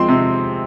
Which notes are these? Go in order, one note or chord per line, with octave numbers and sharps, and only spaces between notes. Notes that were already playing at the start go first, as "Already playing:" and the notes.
Already playing: F3 G#3 C4 C6
C3